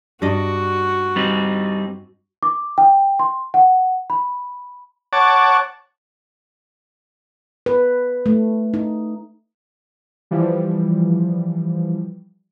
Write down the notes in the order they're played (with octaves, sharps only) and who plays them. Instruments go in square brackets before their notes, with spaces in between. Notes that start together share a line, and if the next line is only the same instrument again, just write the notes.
[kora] G2 D5 D#5 [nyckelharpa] F#4
[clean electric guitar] G3 C4 D#4
[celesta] D6
G5
C6
F#5
B5
[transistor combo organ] C#5 F#5 A5 D6
[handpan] B4
A3
D#4
[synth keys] E3 F3 G3